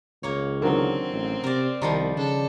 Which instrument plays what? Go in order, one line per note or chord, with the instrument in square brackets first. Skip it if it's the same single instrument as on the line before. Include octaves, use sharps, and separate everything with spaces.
[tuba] C#2 [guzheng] A#3 C#5
[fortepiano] D3 D#3 F#3 [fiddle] C4
[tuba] A1
[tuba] C3 [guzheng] A#4 D5
[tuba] C2 [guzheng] D#3 F3 G3 [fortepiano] G4 A5 A#5
[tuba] C#3 [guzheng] D4 [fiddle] A4